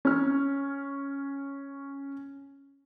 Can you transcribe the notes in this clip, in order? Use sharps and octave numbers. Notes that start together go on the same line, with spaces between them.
C#4 F6